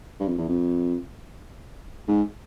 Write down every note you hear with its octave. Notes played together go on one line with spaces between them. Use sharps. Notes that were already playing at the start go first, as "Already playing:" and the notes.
G2
F2
E2
F2
G#2